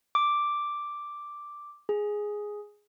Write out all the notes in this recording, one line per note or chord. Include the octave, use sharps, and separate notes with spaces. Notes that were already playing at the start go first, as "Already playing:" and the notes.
D6
G#4